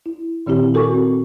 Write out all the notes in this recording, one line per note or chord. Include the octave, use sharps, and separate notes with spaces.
E4
A#2 D#3 C4 E4 G4
F#4 A4 A#4 G#5 C#6 D6
C4